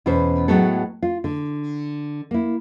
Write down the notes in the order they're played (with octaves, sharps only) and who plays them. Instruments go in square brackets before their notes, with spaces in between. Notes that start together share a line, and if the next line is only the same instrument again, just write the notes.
[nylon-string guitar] E2 B2 C#4 B4 C5
A2 F#3 G#3 B3 A4
F4
D3
A#3 E4